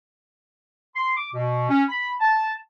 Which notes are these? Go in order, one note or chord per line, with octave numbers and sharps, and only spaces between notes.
C6
D6
B2
C#4
B5
A5